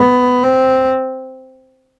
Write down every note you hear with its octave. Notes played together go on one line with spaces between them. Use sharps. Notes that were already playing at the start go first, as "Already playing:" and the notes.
Already playing: B3
C4